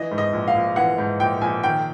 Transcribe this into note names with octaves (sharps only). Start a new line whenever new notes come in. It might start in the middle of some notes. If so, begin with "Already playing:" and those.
Already playing: E3 D#5
G#2
D#5
A#1
F5
A#1
E3 F#5
G#2
A#1 G5
A#1 G#5
D#3 G5